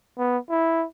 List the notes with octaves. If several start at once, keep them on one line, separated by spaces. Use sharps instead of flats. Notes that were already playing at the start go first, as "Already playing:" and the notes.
B3
E4